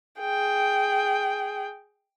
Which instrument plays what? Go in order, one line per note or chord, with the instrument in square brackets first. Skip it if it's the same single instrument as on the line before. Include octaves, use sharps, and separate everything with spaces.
[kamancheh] G#4 G5